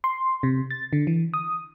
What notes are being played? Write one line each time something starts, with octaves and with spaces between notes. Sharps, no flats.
C6
C3
A6
D3
E3
D#6